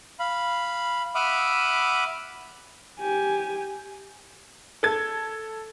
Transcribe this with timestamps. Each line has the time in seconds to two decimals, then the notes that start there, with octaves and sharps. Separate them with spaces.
0.20 F5 B5
1.15 E5 F#5 B5 D6 D#6 F6
3.00 G4 G#5
4.83 A4 G#6